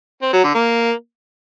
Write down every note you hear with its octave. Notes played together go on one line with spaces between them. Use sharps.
C4
F#3
D3
A#3